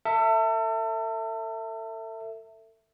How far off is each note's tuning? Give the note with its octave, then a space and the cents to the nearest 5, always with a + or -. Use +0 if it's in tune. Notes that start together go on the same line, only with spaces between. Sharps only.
A4 +35 E5 +0